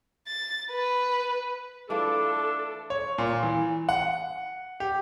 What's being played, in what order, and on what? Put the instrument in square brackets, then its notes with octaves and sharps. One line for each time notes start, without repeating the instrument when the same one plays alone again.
[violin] A6
B4
[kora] E3 A3 F4 [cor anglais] D4 [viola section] A4
[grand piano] C#5
A#2
E3
F#5
G4